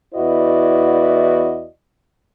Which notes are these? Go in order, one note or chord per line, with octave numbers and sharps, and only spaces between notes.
E2 E4 F#4 B4 D5 D#5